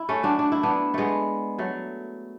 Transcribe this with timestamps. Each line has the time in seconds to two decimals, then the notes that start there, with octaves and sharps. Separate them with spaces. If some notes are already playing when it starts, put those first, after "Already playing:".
Already playing: E4
0.09 A3 C#4
0.23 D4 F#4
0.39 D4
0.52 E4
0.63 B3 D4
0.94 G#3 A3 B3
1.58 F#3 A3